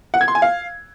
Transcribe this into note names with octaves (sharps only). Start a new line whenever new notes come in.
F#5
G#6
C6
G#5
F5